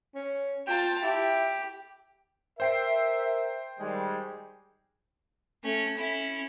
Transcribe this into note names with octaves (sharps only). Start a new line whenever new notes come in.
C#4
F4 G5 A5
E4 G4
A#4 C5 E5 G5 C7
D#3 G3 G#3
A3 C#4
C#4 E4